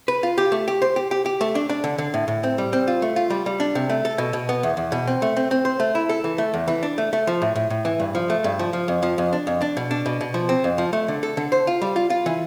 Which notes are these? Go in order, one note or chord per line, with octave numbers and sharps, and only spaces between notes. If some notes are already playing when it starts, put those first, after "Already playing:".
B4
F4
G4
A3
G4
C5
G4
G4
G4
A3
D4
D4
D3
D3
A2
A2
C4
G3
C4
F4
A3
F4
G3
G3
D4
C3
A3
A4
B2
B2
B3
E2
E2
B2
C4
A3
C4
C4
C5
A3
E4
A4
E3
A3
E2
E3
D4
A3
A3
F3
A2
A2
A2
E3
G2
F3
A3
G2
F3
F3
F2
F3
F2
D4
F2
D4
B2
D4
B2
B2
F3
C4
F2
F3
A3
D3
A4
D3
C5
F4
G3
F4
F4
E3